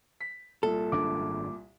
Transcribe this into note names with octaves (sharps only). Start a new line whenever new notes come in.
B6
C2 A#2 A4
G#1 F#2 D4 D6